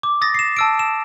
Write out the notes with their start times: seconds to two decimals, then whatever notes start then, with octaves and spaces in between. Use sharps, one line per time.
0.03 D6
0.21 D#6 A6 A#6
0.34 C7 E7
0.57 A5 E6 D7
0.79 E7